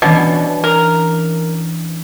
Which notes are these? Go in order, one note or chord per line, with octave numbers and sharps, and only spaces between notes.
B2 E3 C#4 D4
A#4